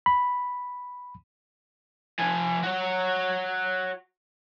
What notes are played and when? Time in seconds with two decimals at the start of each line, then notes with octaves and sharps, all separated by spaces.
0.06 B5
2.19 F3 G#5
2.63 F#4 C#5